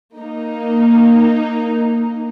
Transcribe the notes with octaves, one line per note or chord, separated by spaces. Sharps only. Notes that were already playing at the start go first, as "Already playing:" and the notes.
A#3 D#4